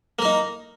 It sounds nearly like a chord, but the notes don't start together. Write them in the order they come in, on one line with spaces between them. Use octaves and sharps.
A#3 A#4 D#4